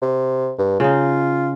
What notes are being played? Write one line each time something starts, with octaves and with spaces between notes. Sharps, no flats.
C3
G2
C#3 D#4 F4